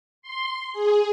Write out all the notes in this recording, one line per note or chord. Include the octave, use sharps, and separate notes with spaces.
C6
G#4